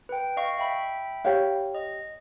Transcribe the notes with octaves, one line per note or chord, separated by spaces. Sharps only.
B4 G5
D#5 F5 C#6
E5 G5 B5
G4 C#5 F5
D#5